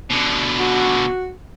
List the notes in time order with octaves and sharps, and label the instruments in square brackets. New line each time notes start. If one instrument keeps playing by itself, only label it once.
[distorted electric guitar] B2 D3
[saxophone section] F#4